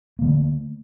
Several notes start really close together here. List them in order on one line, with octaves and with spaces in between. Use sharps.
A#3 D3 A3